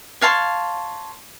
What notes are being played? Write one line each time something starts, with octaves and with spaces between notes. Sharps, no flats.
C#5 F5 A5 C6